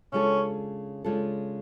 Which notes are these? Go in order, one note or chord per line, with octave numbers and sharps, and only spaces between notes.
C#3 G#3 C#4 D4 F4 A4
C#3 G#3 D4 F4 A4